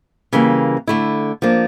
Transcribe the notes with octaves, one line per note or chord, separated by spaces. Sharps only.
C#3 E3 G3 A#3
D3 A3 E4
F3 A#3 D4